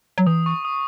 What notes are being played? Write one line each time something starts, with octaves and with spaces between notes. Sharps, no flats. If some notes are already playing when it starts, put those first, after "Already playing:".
F#3
E3 D#6
C#6
D#6